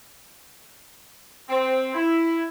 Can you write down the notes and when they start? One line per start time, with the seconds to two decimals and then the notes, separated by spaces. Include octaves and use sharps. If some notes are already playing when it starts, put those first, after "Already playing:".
1.48 C4
1.94 E4